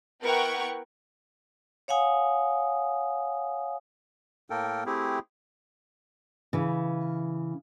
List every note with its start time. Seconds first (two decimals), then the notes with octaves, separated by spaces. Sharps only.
0.23 B3 E4 A#4 F#5 G5 C#6
1.88 C#5 F5 F#5 G#5 D#6
4.50 A2 A#3 A4 A#4 G5
4.86 A3 C4 E4 G4 G#4
6.53 C#3 E3